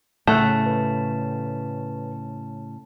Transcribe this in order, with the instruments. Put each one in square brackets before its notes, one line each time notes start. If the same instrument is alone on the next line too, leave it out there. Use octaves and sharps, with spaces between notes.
[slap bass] A2 C#3 [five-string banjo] A3 [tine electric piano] F#5 E6 F#6 [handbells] A5
[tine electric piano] B4